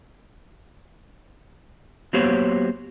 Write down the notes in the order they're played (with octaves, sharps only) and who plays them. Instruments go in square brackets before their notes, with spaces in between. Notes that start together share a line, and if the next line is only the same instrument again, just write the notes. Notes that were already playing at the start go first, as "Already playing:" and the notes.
[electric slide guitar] F#3 A#3 B3 G4 C5 C#5